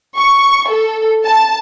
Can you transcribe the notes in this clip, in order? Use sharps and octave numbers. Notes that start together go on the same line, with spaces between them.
C#6
A4
A5